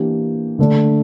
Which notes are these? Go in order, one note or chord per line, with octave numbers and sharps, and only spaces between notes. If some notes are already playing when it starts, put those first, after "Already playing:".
Already playing: E3 A#3 D4 G4
D3 A3 D4